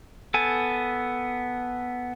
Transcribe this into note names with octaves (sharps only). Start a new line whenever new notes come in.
B3 A4 G#5